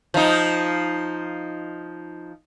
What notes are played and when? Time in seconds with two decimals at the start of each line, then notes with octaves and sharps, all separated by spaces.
0.14 F3 D#4